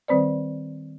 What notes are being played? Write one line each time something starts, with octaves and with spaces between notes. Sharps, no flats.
D#3 G3 C4 B4 C5 D5